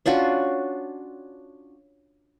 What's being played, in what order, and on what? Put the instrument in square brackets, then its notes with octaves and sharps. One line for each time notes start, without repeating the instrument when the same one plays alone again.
[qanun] C#4 D4 F4 F#4